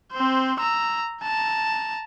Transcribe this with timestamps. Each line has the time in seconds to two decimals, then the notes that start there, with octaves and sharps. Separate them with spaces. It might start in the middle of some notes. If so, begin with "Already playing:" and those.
0.12 C4 C5
0.60 A#5 E6
1.23 A5 A#5